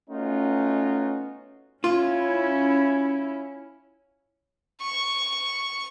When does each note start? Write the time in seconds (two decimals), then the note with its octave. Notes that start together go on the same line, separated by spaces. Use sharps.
0.10 A3 B3 C#4 D#4 F4 F#4
1.84 C#4 E4 F4
4.81 C#6